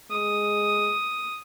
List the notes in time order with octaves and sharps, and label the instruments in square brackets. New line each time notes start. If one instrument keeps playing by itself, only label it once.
[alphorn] G#3 [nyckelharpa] D#6